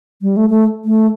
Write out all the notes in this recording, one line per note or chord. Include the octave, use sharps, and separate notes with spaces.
G3
A3
A3
A3